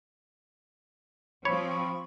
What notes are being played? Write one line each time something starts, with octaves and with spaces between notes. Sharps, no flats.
F3 C4 C#5 B5 C#6